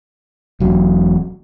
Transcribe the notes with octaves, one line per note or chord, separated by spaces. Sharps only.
E1 F#3